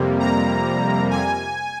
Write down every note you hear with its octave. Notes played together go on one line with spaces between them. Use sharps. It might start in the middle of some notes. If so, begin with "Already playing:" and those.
Already playing: F2 C3 G3 A#3
A#5
G#5